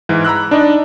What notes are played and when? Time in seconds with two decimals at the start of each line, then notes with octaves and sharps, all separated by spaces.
0.09 G#2 E3
0.25 A#5 B5 E6 F#6
0.51 D4 D#4 D5 D#5